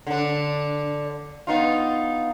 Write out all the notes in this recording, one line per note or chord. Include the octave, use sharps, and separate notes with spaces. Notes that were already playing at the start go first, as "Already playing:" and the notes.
D3 D4
B3 D#4 F4